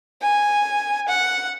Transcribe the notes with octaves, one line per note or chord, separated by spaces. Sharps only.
G#5
F#5